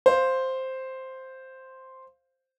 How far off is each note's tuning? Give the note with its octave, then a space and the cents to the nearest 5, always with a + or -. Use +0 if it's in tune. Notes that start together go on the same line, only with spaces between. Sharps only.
C5 +0 F5 +0